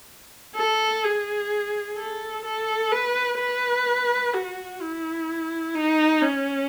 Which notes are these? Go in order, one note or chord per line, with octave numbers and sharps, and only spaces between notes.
A4
G#4
A4
A4
B4
B4
F#4
E4
D#4
C#4